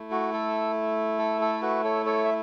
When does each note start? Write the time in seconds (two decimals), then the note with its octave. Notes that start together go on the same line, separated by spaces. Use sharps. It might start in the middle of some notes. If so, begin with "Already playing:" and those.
Already playing: A3 E4
0.11 F#4
0.33 A4
1.19 A4
1.41 A4
1.62 F#4 B4
1.84 A4 C#5
2.06 A4 C#5
2.25 E5